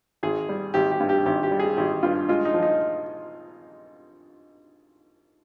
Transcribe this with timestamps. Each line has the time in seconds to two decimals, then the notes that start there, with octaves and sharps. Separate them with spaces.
0.23 G#1 G#4
0.49 G3
0.74 G#1 G4
0.91 G4
1.00 G2
1.09 G4
1.26 G#1 G4
1.43 G4
1.51 G3
1.59 G#4
1.77 G#1 G4
2.03 G2 F4
2.29 G#3 F4
2.45 D#4
2.54 F3
2.63 D#4